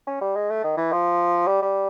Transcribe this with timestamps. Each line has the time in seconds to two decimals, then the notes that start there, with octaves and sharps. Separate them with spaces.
0.07 C#4
0.21 G3
0.36 G#3
0.50 A3
0.64 D#3
0.77 E3
0.92 F3
1.47 G3
1.62 G3